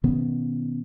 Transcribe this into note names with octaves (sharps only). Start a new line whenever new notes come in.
B2 D#3 B3 C#4